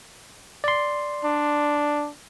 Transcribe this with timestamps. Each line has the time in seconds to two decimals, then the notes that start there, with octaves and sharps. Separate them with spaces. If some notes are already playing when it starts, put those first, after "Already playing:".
0.64 D5 C6
1.24 D4